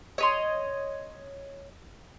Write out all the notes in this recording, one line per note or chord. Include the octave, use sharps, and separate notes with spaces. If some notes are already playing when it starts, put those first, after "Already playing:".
C#5 D#5 C6